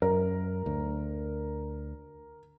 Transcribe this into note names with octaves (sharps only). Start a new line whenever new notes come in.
F#2 A#4
D2